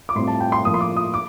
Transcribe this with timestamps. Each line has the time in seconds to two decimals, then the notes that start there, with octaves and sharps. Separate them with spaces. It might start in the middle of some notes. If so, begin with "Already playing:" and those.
0.09 D6
0.15 A2 G3 C4 F4 C6
0.27 A5
0.40 G5
0.52 C6
0.65 A2 F3 A#3 D#6
0.74 C6
0.81 D6
0.97 D#6
1.14 D6